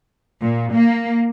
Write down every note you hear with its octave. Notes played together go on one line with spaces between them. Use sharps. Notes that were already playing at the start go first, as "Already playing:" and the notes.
A#2
A#3